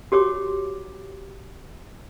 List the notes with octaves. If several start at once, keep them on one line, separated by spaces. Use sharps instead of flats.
F#4 G4 C#5 D6